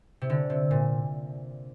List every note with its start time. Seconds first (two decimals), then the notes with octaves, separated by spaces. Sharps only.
0.21 C3
0.30 D3
0.50 C3
0.71 A#2